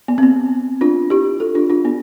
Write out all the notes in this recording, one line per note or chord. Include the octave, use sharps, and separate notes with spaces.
B3
C4
B3
D4 F4
E4 G4
F4 A4
D4 F4
D4 F4
B3 D4